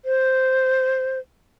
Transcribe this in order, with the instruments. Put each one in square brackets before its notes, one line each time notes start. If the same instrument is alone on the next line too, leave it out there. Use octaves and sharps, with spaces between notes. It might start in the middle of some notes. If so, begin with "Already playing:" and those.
[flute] C5